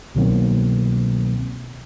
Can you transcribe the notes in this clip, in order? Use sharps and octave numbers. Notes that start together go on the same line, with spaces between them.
C2 B2 D#3 F#3 A#3 C4